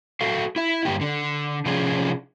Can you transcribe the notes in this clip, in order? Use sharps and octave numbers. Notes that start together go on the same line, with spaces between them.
F#4 A4 E5 F5
E4 E5
G2 D3 A#3 G4
D3 D4
C3 F3 C#4 D4 F4 G#4